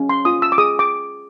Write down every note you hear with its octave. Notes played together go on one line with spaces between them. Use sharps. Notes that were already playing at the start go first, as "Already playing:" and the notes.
Already playing: C#4
C6
F4 D#6
E6
D6
G#4 D#6
D6